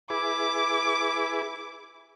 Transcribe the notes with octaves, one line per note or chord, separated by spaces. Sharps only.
E4 G#4 B4 D6